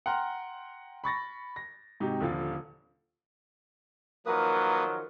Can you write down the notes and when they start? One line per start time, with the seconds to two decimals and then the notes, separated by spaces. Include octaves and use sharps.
0.06 F#5 G5 A#5 C6 F6
1.04 B5 C#6 A6 A#6
1.56 A#6
2.00 G#2 C3 D#4 F#4 G4
2.20 D#1 D3 F3 F5
4.26 D#3 F3 F#3 A#3 A#4 B4 D#6